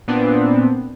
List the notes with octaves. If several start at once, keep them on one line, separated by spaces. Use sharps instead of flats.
A#2 B3 C4 D4